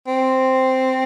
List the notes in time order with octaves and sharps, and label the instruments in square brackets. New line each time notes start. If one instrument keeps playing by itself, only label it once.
[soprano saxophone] C4